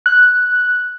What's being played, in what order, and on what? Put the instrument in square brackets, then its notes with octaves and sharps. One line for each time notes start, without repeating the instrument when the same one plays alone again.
[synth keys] F#6